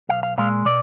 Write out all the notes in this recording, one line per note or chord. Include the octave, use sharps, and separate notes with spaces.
B1 F5
F5
A#2 G#3 F5
B2 D5